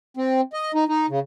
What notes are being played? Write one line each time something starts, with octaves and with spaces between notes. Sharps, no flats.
C4
D#5
D#4
D#4
C#3